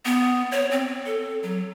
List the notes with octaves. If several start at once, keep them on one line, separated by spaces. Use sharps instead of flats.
B3
C#5
C4
A4
F#3